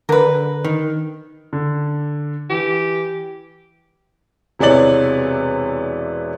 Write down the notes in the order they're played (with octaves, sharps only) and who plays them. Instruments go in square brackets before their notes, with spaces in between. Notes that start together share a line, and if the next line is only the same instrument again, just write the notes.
[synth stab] D3 [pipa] A#4 B4
[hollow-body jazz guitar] D#3
[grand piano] D3
[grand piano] E3 [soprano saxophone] G4
[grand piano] E1 C3 E3 C#5 D5 F#7